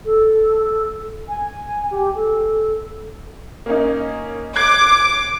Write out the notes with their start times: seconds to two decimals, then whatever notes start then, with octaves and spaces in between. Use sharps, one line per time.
0.05 A4
1.28 G#5
1.91 G4
2.15 A4
3.66 A#3 C#4 D#4
4.56 D6 F#6 G#6 C7